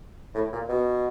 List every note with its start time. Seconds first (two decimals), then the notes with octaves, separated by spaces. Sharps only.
0.34 A2
0.52 A#2
0.69 B2